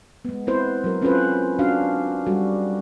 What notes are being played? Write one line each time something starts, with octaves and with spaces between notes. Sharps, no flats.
G#3 B3
B3 C4 E4 B4 C5
F#3 A#4
C4 C#4 F4 A4 B4 C5
F#3 C#4 D4 F#4 F5
G3 F#4 A4